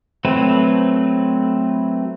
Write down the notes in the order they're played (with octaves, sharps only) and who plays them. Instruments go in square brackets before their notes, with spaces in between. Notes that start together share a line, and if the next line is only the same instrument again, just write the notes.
[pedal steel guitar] F#3 A3 C4 B4